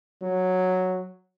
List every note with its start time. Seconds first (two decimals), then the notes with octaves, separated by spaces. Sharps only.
0.22 F#3